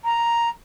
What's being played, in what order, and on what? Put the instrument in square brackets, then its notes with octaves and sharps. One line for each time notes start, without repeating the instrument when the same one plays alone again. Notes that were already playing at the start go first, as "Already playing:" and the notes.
[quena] A#5